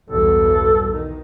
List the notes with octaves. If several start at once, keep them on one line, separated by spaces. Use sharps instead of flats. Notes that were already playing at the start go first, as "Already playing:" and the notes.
B1 E2 G2 A4
D#3